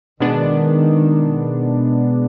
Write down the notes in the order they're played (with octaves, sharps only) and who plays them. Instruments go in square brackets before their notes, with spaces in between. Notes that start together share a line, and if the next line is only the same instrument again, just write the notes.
[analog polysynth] B2 G#3 B3 D4 [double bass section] D#3